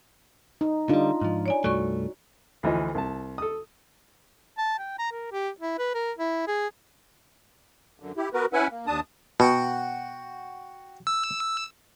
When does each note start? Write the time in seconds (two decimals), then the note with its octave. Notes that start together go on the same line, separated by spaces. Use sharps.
0.61 D#4
0.89 D3 G3 D4 D#4 F4
1.22 G#2 F3
1.46 C#5 D5 G#5
1.64 C2 G2 A3 F#4 D5 C#6
2.63 D2 E3 F3 D#5
2.95 C2 A5
3.38 A4 D#6
4.58 A5
4.79 G5
4.99 A#5
5.12 A#4
5.32 G4
5.60 E4
5.78 B4
5.94 A#4
6.18 E4
6.48 G#4
8.00 F#2 D3
8.17 E4 G4
8.34 B3 F#4 A#4 B4
8.53 C#4 E4 B4 E5 F#5 G#5
8.71 A#3
8.87 D#2 D4 A5 D#6
9.40 B2 F#4 F#5 G5
11.07 E6